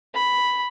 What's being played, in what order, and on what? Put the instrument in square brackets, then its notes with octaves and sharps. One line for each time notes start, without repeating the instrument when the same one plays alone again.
[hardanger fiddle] B5